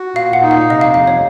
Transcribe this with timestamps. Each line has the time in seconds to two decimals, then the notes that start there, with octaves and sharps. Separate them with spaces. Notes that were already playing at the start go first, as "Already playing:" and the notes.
Already playing: F#4
0.15 A#2 F5
0.33 F#5
0.42 D#4
0.51 F5
0.69 C3 D#5
0.81 F5
0.94 F2 F5
1.07 C#5